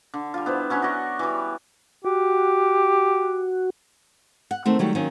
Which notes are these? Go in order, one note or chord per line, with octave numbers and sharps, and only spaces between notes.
D3
G3 F4
B3 E4 C5
F#3 C#4 E4 F#4
F#4 D5 D#5 C#6
E3 G3
F#4 G4
F#5
D#3 A3 C4
D#3 F#3 G3 A3
D#3 F#3 A#3 C#4